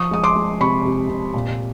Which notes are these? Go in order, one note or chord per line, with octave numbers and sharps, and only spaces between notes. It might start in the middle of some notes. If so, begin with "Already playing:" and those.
Already playing: F3 C#6 D#6
G#3 D#6
C6 D6
G#3
C3 B5 C#6
C3
C3
A#2